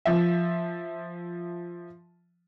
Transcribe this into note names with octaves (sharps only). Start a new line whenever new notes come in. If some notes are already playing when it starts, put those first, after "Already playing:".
F3 E5